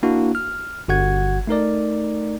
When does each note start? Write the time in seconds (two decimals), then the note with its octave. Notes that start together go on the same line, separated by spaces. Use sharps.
0.03 A#3 D4 E4 F#4
0.35 F6
0.88 G1 F#4 F#5 G#6
1.47 A3 D#4 A#4 D5